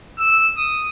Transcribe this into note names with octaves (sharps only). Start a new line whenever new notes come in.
E6
D#6